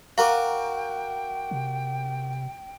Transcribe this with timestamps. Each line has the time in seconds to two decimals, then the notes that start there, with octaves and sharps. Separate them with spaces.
0.18 F#4 A#4 F5 G5 A#5 D6
1.51 C3